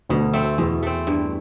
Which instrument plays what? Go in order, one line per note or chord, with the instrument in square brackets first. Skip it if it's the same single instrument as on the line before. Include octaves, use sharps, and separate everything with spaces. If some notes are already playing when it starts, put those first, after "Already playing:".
[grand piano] D2 D3 [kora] B2
[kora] A3 C4
[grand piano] E2 E3 [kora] B2
[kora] A3 C4
G2